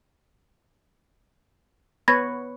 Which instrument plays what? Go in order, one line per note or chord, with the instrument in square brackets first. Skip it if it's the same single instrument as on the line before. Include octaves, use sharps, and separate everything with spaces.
[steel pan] B3 B4 C#5 [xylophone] B5 G#6 A#6